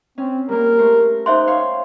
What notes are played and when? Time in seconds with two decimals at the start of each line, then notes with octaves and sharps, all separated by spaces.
0.18 C4 C#4
0.49 G3 A#3 A#4
0.78 A3 C5 C#6
1.26 D#4 C5 E5 F#5 G5 C6
1.47 C#5 F5